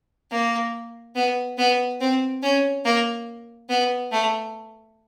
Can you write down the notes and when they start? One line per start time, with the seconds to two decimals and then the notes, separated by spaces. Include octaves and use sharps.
0.31 A#3
1.16 B3
1.58 B3
2.00 C4
2.43 C#4
2.85 A#3
3.69 B3
4.12 A3